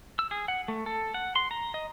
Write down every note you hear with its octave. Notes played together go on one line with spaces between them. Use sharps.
E6
G#4
F#5
A3
A4
F#5
C6
A#5
D#5